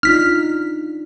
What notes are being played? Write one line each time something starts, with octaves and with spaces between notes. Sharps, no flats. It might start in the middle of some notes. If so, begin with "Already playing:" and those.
D4 D#4 F4 F6 B6